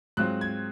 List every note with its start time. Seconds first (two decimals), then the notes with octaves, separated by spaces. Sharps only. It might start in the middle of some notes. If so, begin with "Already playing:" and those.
0.17 G#2 F#3 C4 F4 F#6
0.41 G#6